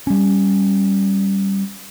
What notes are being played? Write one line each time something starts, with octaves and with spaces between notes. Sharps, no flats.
G3 C#4